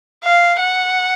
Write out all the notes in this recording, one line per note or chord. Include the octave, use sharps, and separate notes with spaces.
F5
F#5